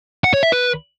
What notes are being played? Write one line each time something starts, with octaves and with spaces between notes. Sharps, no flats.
F#5
C#5
E5
B4